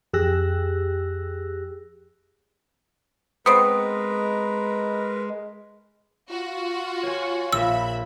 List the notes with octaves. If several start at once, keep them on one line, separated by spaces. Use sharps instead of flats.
F2 G4 G#4 E6 F#6 A#6
G#3 B3 C4 A#4 B4 D#6
F4 F#4 F#5
C#5 G#5
A#1 A#4 E5 B5 E6